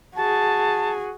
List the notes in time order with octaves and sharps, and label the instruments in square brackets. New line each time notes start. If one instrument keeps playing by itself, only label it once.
[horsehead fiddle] F#4 G#4 [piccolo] A5